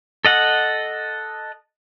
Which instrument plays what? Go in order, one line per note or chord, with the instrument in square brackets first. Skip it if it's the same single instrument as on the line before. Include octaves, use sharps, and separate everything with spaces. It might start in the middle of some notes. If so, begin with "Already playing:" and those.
[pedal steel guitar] A4 D#5 F#5